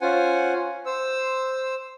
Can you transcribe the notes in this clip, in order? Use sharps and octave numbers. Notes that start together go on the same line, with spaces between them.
C#4 F4 C5 F#5 G#5
C5 E6